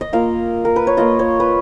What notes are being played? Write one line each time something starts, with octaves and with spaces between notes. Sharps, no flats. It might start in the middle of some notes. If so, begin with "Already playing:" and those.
D#5
A#3 F4 F5
A#4
B4
C#5
A#3 F4 D#5
C#5
B4